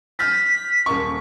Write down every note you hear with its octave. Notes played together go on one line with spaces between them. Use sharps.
F6 G6 A6 B6
D#1 A#4 C#6